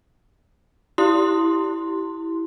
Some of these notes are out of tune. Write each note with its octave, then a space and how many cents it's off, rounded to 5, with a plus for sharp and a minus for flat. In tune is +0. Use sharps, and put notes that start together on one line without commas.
E4 +0 G4 -15 C6 +0